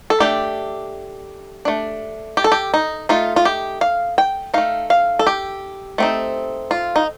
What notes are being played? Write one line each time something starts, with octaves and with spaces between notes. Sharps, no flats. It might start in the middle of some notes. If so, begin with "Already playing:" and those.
A4
A3 D4 G4
A3 D4
G4
A4
G4
D#4
A3 D#4 F4
F4
G4
F5
G5
A3 D#4 F5
F5
A4
G4
A3 C4 D#4
F4
D#4